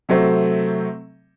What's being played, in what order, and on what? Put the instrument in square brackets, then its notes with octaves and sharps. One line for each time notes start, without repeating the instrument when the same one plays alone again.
[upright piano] C3 F#3 A3 C4